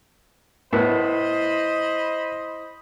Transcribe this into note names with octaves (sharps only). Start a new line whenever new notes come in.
A2 B3 E4 C5 D#5 B5